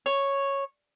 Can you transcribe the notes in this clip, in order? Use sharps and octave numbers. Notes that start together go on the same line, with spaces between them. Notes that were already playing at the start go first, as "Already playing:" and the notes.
C#5